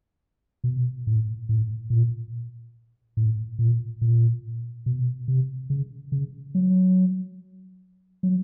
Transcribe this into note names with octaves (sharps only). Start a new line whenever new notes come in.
B2
A2
A2
A#2
A2
A#2
A#2
B2
C3
C#3
C#3
F#3
F#3